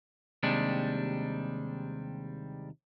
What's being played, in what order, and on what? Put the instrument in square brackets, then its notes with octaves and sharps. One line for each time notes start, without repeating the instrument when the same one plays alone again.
[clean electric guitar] D#2 C3 G3 G#3 D4